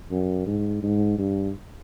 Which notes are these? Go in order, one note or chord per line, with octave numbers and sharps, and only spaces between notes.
F#2
G#2
G#2
G2